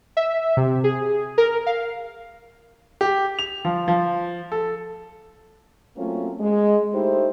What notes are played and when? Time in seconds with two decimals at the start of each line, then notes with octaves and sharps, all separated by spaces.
0.17 E5
0.57 C3
0.84 G#4
1.38 A#4
1.66 F5
3.01 G4
3.39 F7
3.65 F3
3.88 F3
4.52 A4
5.97 F#3 A3 A#3 C4 C#4 F4
6.40 G#3
6.93 A3 D#4 E4 G4 C5